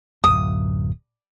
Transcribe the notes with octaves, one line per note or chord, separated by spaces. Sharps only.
D1 F#2 D#6